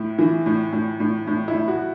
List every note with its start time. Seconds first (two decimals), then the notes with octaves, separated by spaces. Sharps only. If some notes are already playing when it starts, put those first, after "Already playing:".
Already playing: A2 E4
0.19 E3
0.46 A2
0.73 A2
1.00 A2
1.27 A2
1.48 E4
1.54 A2
1.68 F#4